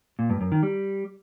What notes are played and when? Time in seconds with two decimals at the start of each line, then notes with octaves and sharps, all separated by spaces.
0.19 A#2
0.30 G2
0.41 F#2
0.52 D#3
0.63 G3